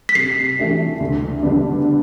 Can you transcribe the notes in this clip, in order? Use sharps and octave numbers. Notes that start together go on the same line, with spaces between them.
B6
C3 C7
E3 A3 D4 G4
D2
D3 G3 B3 D4